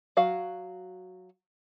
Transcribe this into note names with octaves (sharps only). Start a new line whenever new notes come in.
F#3 F#4 F5